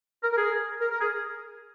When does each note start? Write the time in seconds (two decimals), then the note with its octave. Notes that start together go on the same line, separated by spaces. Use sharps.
0.22 A#4
0.32 A#4
0.36 G#4
0.80 A#4
0.90 A#4
1.00 G#4